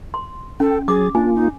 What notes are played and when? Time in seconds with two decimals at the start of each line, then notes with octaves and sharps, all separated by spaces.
0.14 C6
0.60 C#4 A4 G5
0.88 F#3 G#4 D6 A6
1.15 A#3 D4 F4 G#5
1.35 D#4